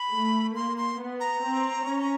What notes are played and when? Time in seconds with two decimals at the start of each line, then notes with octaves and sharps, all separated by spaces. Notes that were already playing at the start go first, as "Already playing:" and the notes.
Already playing: B5
0.13 A3
0.55 A#3 C6
0.77 C6
0.99 B3
1.20 A#5
1.41 C4
1.85 C#4